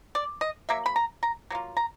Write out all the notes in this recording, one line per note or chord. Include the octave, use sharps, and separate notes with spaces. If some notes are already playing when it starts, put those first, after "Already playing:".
D5
D#5
F#3 A#3 E5
B5
A#5
A#5
F#3 A#3 F4
A#5